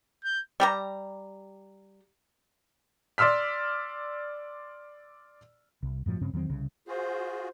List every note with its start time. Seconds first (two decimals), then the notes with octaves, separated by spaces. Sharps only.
0.25 G6
0.60 G3 G4 A#5
3.18 D5 C6 E6 F6 B6
5.83 C2
6.06 F#2 A2 F3 F#3
6.21 G2 C#3 C4 C#4
6.33 E2 D#3 F#3 C4
6.50 C2 C#3
6.87 F4 F#4 G#4 C5